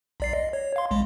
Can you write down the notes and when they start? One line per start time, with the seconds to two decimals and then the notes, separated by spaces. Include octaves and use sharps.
0.20 B1 D5 C7
0.34 D#5
0.53 C#5
0.76 F5 C6
0.91 A#1 G#3